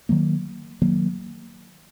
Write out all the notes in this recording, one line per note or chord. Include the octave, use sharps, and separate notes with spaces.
D#3 F#3 A#3
D#3 F#3 A#3